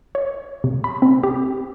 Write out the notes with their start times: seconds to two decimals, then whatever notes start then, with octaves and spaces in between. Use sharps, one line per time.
0.15 C#5
0.64 C3
0.84 B5
1.02 C4
1.23 G4